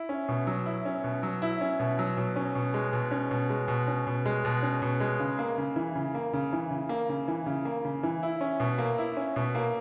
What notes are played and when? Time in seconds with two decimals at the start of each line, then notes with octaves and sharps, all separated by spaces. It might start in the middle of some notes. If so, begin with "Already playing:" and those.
Already playing: E4
0.09 C#4
0.28 B2
0.47 F#3
0.66 E4
0.85 C#4
1.04 B2
1.23 F#3
1.42 E4
1.61 C#4
1.80 B2
1.99 F#3
2.17 B2
2.36 C#4
2.55 B2
2.74 G#3
2.93 B2
3.11 C#4
3.31 B2
3.50 G#3
3.68 B2
3.88 C#4
4.07 B2
4.26 G#3
4.45 B2
4.62 C#4
4.82 B2
5.00 G#3
5.20 C#3
5.39 A#3
5.58 C#3
5.76 E3
5.95 C#3
6.14 A#3
6.33 C#3
6.53 E3
6.71 C#3
6.89 A#3
7.09 C#3
7.28 E3
7.46 C#3
7.65 A#3
7.85 C#3
8.03 E3
8.23 E4
8.41 C#4
8.60 B2
8.78 A#3
8.98 E4
9.17 C#4
9.36 B2
9.55 A#3